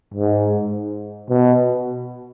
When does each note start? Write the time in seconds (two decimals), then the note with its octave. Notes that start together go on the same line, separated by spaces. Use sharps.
0.14 G#2
1.29 B2